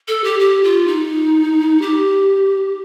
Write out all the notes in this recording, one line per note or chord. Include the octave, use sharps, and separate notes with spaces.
A4
G4
G4
F4
D#4
G4